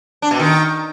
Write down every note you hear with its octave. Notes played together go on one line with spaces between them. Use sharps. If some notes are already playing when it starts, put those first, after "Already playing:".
D4
B2
D#3